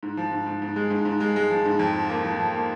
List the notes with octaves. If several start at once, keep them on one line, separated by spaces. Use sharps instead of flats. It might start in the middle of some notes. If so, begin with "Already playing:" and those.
G#2
F3
G#2
G#2
G#2
G#3
G#2
G#2
G#3
G#3
F3
G#2
F2
F3
A#3
F3
F2
A#3